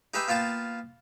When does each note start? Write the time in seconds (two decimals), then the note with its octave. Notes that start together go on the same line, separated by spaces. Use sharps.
0.14 D#4 G4 G#4 B4 E5
0.28 A#3 B3 F4 G5 A5